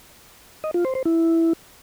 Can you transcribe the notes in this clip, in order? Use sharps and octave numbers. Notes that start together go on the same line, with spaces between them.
D#5
F4
C5
C5
E4